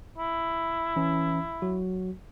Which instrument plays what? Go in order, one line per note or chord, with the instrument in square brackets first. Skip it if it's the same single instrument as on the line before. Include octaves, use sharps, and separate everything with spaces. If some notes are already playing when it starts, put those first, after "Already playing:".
[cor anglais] E4
[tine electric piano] E3 C#4
F#3 F#4